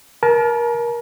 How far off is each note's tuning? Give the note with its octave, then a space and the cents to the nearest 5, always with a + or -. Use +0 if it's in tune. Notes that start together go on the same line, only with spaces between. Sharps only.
A#4 +25 A5 -30